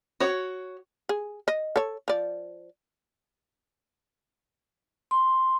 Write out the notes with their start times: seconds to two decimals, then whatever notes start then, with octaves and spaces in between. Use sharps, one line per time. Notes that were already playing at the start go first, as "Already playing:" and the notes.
0.20 F#4 C#5
1.09 G#4
1.48 D#5
1.76 A4 C#5
2.08 F3 D5
5.11 C6